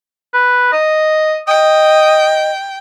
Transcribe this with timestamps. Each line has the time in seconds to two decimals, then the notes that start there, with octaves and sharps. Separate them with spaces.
0.33 B4
0.72 D#5
1.48 D#5 G5 D#6